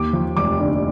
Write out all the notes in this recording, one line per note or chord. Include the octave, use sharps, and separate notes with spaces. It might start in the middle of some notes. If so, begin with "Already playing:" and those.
Already playing: D#2 D6
F3
F1 D6
D3